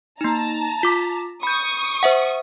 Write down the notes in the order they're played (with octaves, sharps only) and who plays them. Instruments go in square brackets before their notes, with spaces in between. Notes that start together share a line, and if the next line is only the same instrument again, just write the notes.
[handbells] A#3 D#4 [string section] A5 A#5
[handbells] F4 D6 B6
[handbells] B5 G6 [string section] C#6 D#6
[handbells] C5 E5 F#5